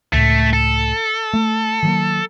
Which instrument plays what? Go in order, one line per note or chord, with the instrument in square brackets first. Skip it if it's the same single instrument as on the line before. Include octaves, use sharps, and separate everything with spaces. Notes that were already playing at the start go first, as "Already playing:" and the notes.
[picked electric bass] C#2 A2 [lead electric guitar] A3
[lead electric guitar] A4
[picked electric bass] A3
D#3 F#3 A#3